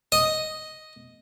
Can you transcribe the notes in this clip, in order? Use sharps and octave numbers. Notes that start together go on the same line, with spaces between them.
D#5